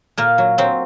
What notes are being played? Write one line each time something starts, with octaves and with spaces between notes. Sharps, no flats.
A#2 A#3
F#3
F#3 C4